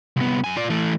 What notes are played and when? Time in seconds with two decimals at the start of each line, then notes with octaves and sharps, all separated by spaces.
0.16 C2 B3
0.44 F#2 G#5
0.57 F4 D5
0.70 E3 A3